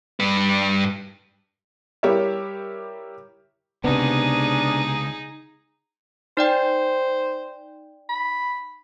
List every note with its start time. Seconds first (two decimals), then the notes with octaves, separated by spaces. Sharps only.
0.20 G2 B4
2.03 G3 E4 G4 A#4 C#5 E5
3.84 C#2 C3 B3 D4 D#4 G#4
6.37 D#4 C5 D5 G5
8.09 B5